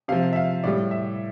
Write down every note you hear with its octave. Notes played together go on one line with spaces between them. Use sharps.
C3 F3 F5
E5
F5
A2 G3 D5
E5